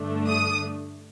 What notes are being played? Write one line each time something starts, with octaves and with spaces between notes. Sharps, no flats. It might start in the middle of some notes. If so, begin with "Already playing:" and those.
Already playing: G2 D3 A3 D4
D#6